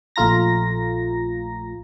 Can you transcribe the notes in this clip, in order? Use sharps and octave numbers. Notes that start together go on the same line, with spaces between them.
A#1 A3 F4 A#5 A#6